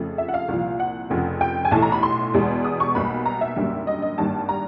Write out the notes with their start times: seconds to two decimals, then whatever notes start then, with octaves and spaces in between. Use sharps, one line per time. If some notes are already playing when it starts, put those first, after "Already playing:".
Already playing: F2 C#3 F3 A3
0.18 E5
0.28 F#5
0.34 F5
0.48 C2 A#2 F3
0.80 F#5
1.10 F1 F2 C#3
1.41 G5
1.65 G#5
1.71 B1 A2 E3 A3 A5
1.82 A#5
1.92 B5
2.03 C6
2.34 E2 B2 G#3
2.64 D#6
2.80 C#6
2.95 B1 B2 G3 A#3 B5
3.26 A#5
3.41 E5
3.56 G#1 F#2 D3 G3 A#3
3.87 D#5
4.02 D#5
4.18 G#1 G2 D#3 G3 A#3 A5
4.49 A#5